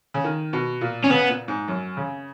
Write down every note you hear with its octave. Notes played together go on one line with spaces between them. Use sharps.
C#3
D#3
B2
A#2
C#4
C#3 B3
A#2
G#2
F#2
C#3